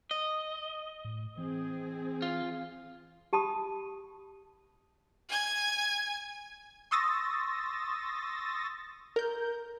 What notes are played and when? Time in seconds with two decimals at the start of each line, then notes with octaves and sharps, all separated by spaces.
0.11 D#5
1.05 A2
1.38 E3 C4 G#4
2.22 F4
3.33 G4 A5 B5 D#6
5.29 G#5 G#6
6.91 C6 C#6 D#6 E6 A6 A#6
9.16 A#4 G6